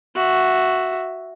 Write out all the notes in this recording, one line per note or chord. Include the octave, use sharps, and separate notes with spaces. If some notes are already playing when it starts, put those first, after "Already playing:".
F#4 E5